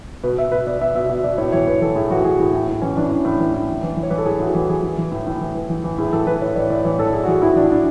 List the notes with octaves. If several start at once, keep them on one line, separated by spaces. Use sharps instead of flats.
B2 B4
B2 E5
B2 B4
B2 D5
B2 E5
B2 E5
B2 E5
B2 D5
A2 C#5
E3 C#5
A2 B4
E3 A4
A2 G#4
E3 F#4
E3 G#4
A2 G#4
A2
A2
E3 C#4
E3 D4
A2
A2
E3
A2
A2
E3
E3
C#5
E3 B4
A4
A2 G#4
A2 F#4
E3
E3 G#4
E3
E3
A2
A2
E3
E3
E3
E3
A2 G#4
E3 A4
E3 B4
A2 C#5
E3 D5
A2 D5
E3 C#5
A2 A4
E3 G#4
F#4
E3 G#4
A2 E4
E3 D4
A2 D4